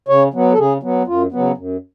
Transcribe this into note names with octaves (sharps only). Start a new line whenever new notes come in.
C#3 C#5
F#3 B3
A4
C#3 G#4
F#3 B3
F#2 F4
C#3 F#3 B3
F#2